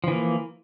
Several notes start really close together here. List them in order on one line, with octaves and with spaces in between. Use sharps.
F3 E3 A#3